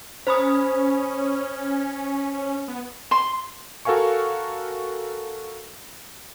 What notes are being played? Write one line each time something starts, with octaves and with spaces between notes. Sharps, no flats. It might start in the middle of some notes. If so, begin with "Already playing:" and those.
C#4 C5 B5 D#6
B3
C6
F#4 A4 A#4 F5 G#5 C#6